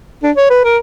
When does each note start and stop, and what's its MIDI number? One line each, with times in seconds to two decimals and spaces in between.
0.23 0.31 62
0.36 0.46 73
0.50 0.62 71
0.64 0.77 70